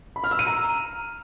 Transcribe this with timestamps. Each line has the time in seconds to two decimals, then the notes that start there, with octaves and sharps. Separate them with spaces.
0.16 B5
0.24 F6
0.31 E6
0.39 D#7
0.47 A#5